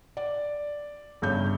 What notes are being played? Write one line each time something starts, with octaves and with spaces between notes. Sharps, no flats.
D5
G1 G2 C#3 C#5 G6